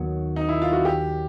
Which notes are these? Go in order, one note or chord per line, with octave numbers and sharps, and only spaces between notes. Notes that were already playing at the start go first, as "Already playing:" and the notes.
Already playing: D#2 D#3 F#3 B3
D#4
E4
F4
F#4
G4